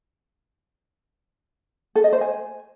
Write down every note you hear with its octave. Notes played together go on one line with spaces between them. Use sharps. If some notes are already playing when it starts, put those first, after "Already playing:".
A4
D#5
C5
G#5